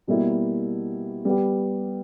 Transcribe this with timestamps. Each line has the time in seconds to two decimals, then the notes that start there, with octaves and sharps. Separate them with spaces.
0.07 B2 G3 A#3 E4
1.25 G3 B3 G4